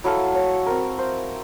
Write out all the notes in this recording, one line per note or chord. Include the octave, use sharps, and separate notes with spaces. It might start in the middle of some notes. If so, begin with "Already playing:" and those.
F#3 E4 A4 F5
C#5
C4 A#4
C5